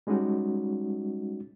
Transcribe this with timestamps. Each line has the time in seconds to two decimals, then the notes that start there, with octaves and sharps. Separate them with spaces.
0.07 G3 G#3 C#4 D#4 F#4